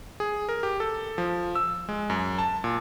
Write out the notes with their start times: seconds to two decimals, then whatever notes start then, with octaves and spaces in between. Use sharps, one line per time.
0.20 G#4
0.49 A#4
0.63 G4
0.80 A4
1.18 F3
1.55 E6
1.89 G#3
2.10 F#2
2.38 A5
2.64 A#2